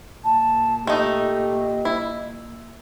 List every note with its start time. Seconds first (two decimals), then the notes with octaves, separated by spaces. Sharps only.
0.24 A#2 A5
0.87 A3 D#4 G4 D#5
1.85 E4